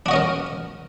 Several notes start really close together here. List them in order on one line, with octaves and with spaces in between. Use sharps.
D4 F#4 D#5 C#4 A#4